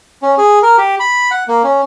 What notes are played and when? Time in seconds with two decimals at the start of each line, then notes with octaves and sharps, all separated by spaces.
0.22 C#4
0.38 G#4
0.63 A#4
0.78 G4
1.00 B5
1.31 F#5
1.48 A#3
1.64 C#4